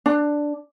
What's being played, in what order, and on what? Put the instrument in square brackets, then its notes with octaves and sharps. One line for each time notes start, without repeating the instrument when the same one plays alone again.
[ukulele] D4